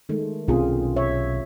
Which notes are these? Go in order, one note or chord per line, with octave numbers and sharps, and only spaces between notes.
D#3 G#3 A3
B1 C3 C4 C#4 F4 G#4
C#5 E5